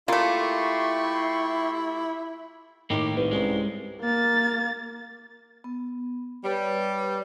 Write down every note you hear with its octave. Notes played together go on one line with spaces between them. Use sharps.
A3 A#3 E4 F4 G4 C6 C#6
A2 D#3 A#3 D#4 G4 D6
C2 D#3 B4
C2 G#2 G#3 C#4
A#3 A6
B3
G3 B4 C#5